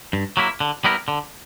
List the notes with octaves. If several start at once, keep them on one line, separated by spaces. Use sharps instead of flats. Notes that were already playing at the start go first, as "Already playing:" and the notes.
G2
F#3 A#3 E4
D3
G3 B3 E4 A#4
D3